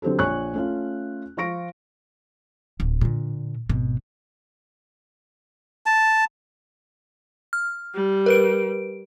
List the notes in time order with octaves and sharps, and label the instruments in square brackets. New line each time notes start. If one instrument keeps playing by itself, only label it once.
[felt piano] D3 F#3 C4 G4 A4
A#1 C#5 G#5 C#6 F#6
A3 C#4 F4
F3 F4 C#6 A#6 D7
[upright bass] D1
A#2 D3
G#1 B2
[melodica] A5
[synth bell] F6
[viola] G3
[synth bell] A#4 B4 D7